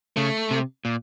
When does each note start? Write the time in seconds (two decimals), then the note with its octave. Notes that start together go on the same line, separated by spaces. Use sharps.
0.17 C#3 A3
0.51 C3
0.85 A#2